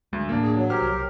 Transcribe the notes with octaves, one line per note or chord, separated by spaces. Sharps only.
D2 G#3
A2 E3 A#3 D4
G#4
F#3
G4 A#4 C5 F6
C2